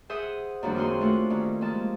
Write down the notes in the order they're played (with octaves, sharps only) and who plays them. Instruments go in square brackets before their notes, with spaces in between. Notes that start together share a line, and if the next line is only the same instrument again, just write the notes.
[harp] G#4 C5 E5 F#5 D#6
F#2 D#3 F3 G3 A#3 D4
A#3 C4 D#4 F#4 G#4 C6
A3 D4 F4 F#4
G2 D#3 C#4
F3 G#3 A#3 A5